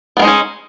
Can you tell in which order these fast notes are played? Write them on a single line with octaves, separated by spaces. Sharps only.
B3 A#3 G#3 D#4 C#4